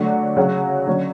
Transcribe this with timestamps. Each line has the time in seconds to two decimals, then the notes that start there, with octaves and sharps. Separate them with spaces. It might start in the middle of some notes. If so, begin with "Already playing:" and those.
Already playing: D3 F#3 A3 D4 F#4
0.37 C#3 F#3 C#4 F#4
0.87 D3 F#3 C#4